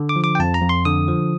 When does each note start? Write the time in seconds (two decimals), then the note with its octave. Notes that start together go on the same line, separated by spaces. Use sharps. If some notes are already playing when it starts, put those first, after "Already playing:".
Already playing: D3
0.09 D6
0.16 F3
0.24 D6
0.35 G5
0.40 F2 A5
0.54 A#5
0.62 F2
0.69 C6
0.85 D3 D#6
1.08 F3